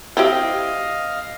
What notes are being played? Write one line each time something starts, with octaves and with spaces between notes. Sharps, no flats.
C4 E4 G4 D#5 F5